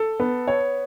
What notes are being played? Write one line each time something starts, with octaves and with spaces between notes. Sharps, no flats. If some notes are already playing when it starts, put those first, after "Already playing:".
Already playing: A4
B3
C#5